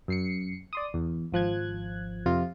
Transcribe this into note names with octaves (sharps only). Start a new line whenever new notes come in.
F#2 C7 C#7
D5 C6 D#6
E2
G#1 F3 F#6 G#6
F2 C3 F4